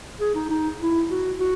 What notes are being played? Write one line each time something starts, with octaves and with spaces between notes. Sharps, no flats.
G#4
D#4
D#4
E4
F#4
F#4